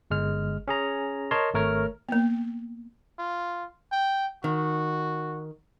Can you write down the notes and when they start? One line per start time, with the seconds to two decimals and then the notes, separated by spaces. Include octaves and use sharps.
0.11 G1 G#3 F6
0.68 C#4 G#4 A#5
1.31 A#4 C#5 D#5 A5 C6
1.54 G#1 A3 A#4 C#5 F6
2.09 A#3 B3
3.19 F4
3.92 G5
4.44 D#3 F#4